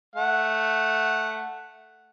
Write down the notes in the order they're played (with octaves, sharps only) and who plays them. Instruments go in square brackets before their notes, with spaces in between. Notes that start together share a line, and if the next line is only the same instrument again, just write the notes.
[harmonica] A3 F#5